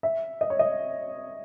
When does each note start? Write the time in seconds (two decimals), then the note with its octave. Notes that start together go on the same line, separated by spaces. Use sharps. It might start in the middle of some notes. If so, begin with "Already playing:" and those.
0.03 E5
0.41 D#5
0.50 C#5
0.59 D#5